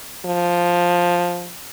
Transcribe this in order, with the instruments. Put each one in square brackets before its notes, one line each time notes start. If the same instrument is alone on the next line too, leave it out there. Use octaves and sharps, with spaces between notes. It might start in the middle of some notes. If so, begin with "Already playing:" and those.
[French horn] F3